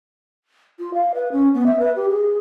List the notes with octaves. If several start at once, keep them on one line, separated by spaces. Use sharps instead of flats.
F4
F5
B4
C#4
B3
E5
B4
G4
G#4